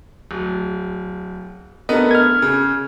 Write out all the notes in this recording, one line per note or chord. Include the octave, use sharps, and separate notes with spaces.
D1
A3 B3 D4 A#4 D#5
F6 G#6
C#3